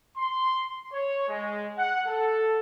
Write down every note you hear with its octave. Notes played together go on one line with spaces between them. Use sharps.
C6
C#5
G#3
F#5
A4